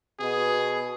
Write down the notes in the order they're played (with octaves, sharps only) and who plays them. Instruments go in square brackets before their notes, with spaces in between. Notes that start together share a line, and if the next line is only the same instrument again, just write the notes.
[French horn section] B2 [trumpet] G#4